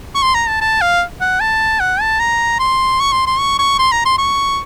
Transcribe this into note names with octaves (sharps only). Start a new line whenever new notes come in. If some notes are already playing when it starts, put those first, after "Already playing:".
C#6
C6
A#5
A5
A5
F5
F#5
A5
F#5
A5
A#5
C6
C#6
C6
C6
C#6
C#6
C6
A#5
C6
C#6